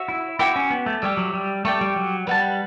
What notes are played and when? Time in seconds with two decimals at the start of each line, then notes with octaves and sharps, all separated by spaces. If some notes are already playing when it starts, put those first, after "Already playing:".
Already playing: F#4 C#5 E5
0.08 E4
0.39 E4 F#4 C#5 G5 D6
0.56 C#4
0.70 B3
0.86 A3
1.02 G3 G4 C#5 E5
1.17 F#3
1.34 G3
1.65 A3 G4 D5 G5 C#6
1.81 G3
1.96 F#3
2.27 G3 B4 F#5 A5